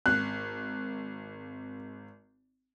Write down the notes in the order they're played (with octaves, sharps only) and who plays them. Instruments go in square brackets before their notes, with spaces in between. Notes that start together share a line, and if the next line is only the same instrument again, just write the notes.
[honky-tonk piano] G#1 [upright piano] F#6